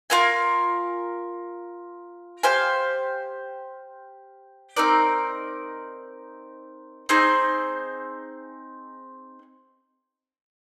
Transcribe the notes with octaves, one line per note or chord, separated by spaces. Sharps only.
F4 A#4 F5 G#5
G4 C5 F5 G#5
C4 D#4 A#4 D5
C4 D#4 G#4 C5